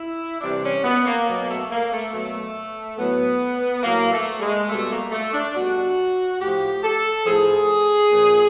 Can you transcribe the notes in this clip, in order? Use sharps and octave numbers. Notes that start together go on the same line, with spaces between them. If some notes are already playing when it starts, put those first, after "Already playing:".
Already playing: E4
C3 E3 G3 D4
C#4
B3
A#3
B2 F#3
A#3
A3
A#3
A3
B2 F#3 A3
A2 F#3 B3
A2 F#3 A#3
A3
G#3
B2 G3 A3
A#3
A3
D4
B2 G3 F#4
A2 F3 G4
A4
A2 F3 G#4
A#2 F3